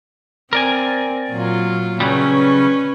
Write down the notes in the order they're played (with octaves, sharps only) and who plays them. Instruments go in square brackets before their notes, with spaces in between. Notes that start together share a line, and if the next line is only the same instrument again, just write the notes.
[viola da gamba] C4 [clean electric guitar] A#4 D5 G#5
[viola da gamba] A#2 F#3 F4
[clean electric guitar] C#3 F#3 G3 [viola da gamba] C#4 B4